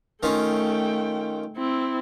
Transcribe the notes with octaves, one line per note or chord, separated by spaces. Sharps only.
D#3 A3 C#4 F4 G5
C4 E4